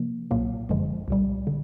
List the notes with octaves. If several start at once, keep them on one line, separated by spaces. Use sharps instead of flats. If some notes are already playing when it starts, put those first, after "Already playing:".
Already playing: C3 F3 A#3
B1 A#2 F#3 A#3
G1 F#2 D3 F3 G#3
C2 A#2 G3
D3